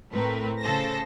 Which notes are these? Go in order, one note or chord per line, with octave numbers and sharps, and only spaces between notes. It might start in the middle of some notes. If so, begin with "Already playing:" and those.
A2 A3 C4 A#4 B4
C#3 A4 C5 A5 A#6